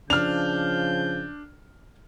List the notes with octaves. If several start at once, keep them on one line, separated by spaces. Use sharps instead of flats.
C#3 F3 D4 F6 G6 F7